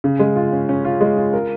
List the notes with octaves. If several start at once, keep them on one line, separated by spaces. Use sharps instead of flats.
C#3
G#3
F4
C#4
C#4
F4
G#3
F4
A#4